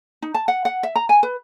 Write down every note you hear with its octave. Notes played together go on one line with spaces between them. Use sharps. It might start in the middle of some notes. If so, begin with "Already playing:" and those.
D#4
A5
F#5
F#5
E5
A#5
G#5
B4